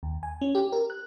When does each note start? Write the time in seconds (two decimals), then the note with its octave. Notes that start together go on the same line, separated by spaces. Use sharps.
0.03 D#2
0.23 G#5
0.41 C#4
0.55 G4
0.72 A#4
0.90 F#6